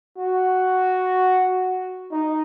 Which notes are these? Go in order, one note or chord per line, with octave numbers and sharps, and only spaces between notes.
F#4
D#4